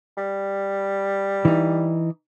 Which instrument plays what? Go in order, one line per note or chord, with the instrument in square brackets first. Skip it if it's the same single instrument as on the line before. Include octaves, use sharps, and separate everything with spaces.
[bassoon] G3
[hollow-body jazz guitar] E3 D#4